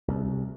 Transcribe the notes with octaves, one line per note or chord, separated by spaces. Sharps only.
C2